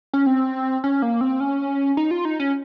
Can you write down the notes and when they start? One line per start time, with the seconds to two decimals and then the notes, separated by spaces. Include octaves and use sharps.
0.13 C#4
0.26 C4
0.84 C#4
1.02 A#3
1.21 C4
1.40 C#4
1.97 D#4
2.11 F4
2.25 D#4
2.40 C#4